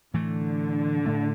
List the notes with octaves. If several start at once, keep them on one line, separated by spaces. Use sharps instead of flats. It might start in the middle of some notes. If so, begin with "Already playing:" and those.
A2 D3 E3 A3
A2 A3 D4